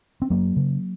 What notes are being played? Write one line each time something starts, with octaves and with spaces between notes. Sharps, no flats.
C4
F#2 F#3 A#3
C#3